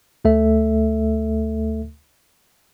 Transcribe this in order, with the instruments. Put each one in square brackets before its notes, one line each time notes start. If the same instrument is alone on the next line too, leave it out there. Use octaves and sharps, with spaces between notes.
[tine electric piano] D2 A3 A4 E5